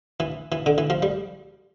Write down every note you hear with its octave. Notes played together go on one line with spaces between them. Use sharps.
E3
E3
D3
E3
F3
G3